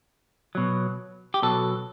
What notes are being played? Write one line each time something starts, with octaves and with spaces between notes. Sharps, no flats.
B2 F#3
G4
B2 F#3 A4